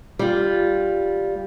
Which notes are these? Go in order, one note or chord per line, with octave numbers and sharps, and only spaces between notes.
G3 F4